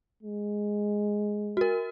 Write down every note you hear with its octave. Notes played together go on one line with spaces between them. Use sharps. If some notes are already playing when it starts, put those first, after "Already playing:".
G#3
F#4 A#4